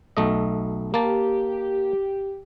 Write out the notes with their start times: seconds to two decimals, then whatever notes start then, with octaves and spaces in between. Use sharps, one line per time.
0.17 B1 A3 D#5
0.94 A#3 G4 A5